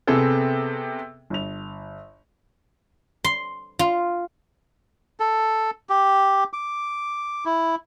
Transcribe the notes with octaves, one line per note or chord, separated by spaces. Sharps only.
C3 B3 C4 G#4 A4
G1 F7
C6
F4
A4
G4
D6
E4